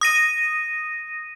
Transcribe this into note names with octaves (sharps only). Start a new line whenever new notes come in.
D#6 A#6 D#7